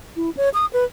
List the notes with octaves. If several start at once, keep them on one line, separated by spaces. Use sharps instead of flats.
E4
C#5
D#6
B4